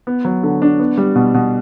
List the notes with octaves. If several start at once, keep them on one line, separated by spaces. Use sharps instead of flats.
B3
F#3
D3
D4
B3
G3
B2
B2